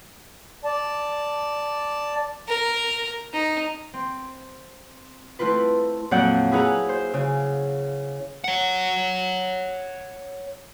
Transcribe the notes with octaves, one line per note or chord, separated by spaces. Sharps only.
D5 A5
A#4
D#4
C4
A3 C4 E4 F4 B4
F2 A#2 F#3 D5 F#5 G6
E4 G#4 B4 F#5 A#5
C5
C#3
C#5 F#5